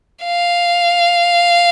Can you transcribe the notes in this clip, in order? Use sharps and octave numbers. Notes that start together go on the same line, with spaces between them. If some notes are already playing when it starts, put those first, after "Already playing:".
F5